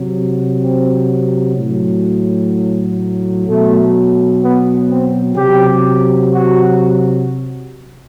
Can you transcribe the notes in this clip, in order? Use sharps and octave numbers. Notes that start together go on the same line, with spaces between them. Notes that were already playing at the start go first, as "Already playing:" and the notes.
Already playing: C3 F#3
C4
A2 F#3
B2 F#3 A3
B3
C4
C3 F#3 G4
F#4